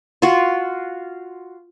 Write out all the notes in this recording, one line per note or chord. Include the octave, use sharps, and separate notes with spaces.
F4 F#4